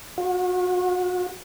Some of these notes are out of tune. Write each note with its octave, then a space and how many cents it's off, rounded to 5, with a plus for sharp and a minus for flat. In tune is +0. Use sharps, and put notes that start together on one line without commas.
F#4 -35